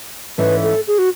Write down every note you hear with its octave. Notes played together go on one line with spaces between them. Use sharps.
G#2 E3 A3 C#4 B4
A4
G#4
F#4